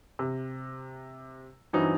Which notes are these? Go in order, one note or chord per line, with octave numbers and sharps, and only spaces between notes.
C3
G2 E3 F#3 C4 D#4